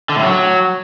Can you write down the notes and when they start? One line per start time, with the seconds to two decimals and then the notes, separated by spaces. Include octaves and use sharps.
0.09 D3
0.16 A2
0.23 F#3